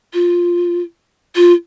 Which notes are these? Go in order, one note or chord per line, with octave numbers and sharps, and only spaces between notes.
F4
F4